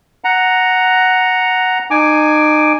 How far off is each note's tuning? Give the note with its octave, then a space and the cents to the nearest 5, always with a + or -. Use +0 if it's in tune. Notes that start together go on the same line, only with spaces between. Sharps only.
F#5 +0 A#5 +0
D#4 -30 G#5 +0 D6 +0